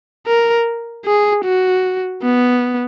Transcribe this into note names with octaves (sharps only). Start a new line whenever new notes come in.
A#4
G#4
F#4
B3